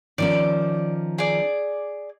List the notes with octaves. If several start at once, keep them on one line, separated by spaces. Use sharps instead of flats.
D#3 F3 C#4 D5
G#4 D5